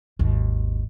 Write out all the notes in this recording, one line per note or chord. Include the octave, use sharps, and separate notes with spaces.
G#1 D#2